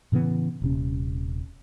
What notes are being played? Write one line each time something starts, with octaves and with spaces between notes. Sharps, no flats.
A2 C#3 E3 B3
D#1 C3 C#4